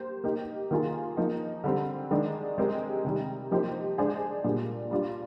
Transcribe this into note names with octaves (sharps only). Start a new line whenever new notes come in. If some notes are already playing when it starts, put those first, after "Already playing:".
Already playing: A#3 G4 C5
A#3 D#4 G4
D#3 A#3 F4 G#4
F3 A#3 D#4
D3 G3 C4
D#3 G#3 D4
G#3 C4 G4 A#4
C3 D#3 G3
F3 A#3 D#4 G4 C5
G#3 D4 G#4 C5
A#2 G3 D4
G3 D4 F4